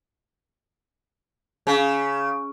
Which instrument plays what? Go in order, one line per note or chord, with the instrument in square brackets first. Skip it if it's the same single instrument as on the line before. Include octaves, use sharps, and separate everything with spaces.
[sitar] C#3